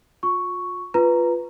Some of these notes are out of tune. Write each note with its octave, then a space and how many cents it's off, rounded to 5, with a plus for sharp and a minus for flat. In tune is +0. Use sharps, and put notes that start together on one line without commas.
F4 +40 C#6 +0
F4 -5 B4 +0 A#5 +0